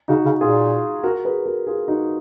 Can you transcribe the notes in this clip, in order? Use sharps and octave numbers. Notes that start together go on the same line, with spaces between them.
C#3 D#4 F#4
C#3
A#2 F4 G#4
F#4 A#4
G#4 B4
F#4 A#4
F4 G#4
D#4 F#4